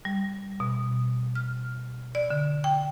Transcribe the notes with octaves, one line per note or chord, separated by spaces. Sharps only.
G3
B2
F6
D5
D3
G5